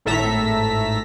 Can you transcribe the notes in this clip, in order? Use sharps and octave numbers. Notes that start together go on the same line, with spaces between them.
G#1 A2 A4 E5 A#5 B6